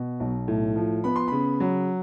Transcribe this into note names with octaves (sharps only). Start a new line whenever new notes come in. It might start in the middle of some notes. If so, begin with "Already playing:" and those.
Already playing: B2
B1
A2
F3
B3 B5
C6
C#3 B5
F#3